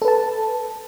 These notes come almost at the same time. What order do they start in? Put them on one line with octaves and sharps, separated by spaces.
A4 B4 A5